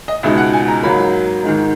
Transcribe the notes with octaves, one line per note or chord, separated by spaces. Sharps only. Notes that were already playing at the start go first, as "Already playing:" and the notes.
D#5
C#2 B2 G#3 D#4 E5
F#5
G#5
A#5
G#2 F#3 A#3 B5
G#2 D#3 G#3